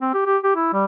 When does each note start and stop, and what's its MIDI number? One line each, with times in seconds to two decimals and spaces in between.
0.01 0.11 60
0.14 0.24 67
0.26 0.37 67
0.43 0.53 67
0.56 0.72 64
0.73 0.85 55